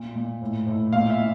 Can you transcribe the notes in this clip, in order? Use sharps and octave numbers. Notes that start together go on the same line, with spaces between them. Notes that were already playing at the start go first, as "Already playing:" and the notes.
Already playing: A#2
A#2
A2
A2
A#2 F5
E5
A#2